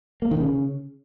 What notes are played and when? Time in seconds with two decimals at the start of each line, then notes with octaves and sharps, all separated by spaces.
0.22 A#3
0.31 D#3
0.40 C#3